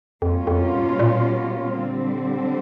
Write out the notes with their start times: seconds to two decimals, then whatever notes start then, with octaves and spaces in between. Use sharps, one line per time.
0.22 F2 B2 G3 A#3 C#4 F4
0.47 F2
0.73 G#2
0.99 A#2
1.76 D3 G3 C4